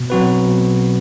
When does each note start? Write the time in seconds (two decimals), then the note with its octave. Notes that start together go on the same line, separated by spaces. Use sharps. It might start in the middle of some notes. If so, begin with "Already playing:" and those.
Already playing: B2
0.10 F#3 C4 F#4 B4
0.48 B2